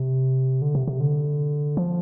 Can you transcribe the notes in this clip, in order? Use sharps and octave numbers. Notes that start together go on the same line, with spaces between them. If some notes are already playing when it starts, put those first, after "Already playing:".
Already playing: C3
D3
C3
C3
D3
F3